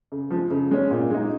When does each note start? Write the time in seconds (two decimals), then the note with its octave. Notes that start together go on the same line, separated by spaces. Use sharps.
0.12 C#3
0.30 F3 G#3
0.51 C#3
0.71 G#3 C#4
0.91 A#2
1.10 G#3 D#4